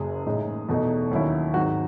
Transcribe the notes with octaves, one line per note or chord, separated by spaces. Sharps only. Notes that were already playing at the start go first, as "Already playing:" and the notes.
Already playing: F#1 F#2 C#3 G#4
A1 A2 G#3 D#4
E2 B2 A3 D#4
D#2 D#3 F#3 C#4 E4
G#1 G#2 F#3 F#4